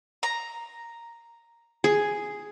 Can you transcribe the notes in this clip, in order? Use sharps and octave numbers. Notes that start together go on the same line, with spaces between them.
A#5
G#4